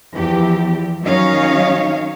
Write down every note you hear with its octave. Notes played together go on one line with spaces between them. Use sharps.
E2 E3 F3 G4
D#3 F#3 C#4 D#4 C#5 F5